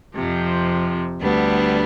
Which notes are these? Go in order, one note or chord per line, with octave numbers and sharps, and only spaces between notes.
F2 C3 F3
D2 D3 G3 B3 D4